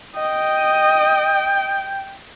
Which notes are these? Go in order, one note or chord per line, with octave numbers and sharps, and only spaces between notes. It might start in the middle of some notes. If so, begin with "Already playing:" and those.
D#5 G5